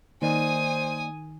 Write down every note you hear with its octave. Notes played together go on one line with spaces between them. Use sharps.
D#3 A#3 C5 D5 D#5 G#5 D#6